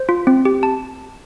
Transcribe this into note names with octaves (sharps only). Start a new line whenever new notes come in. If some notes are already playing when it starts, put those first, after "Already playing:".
Already playing: C5
F4
C4
G4
A5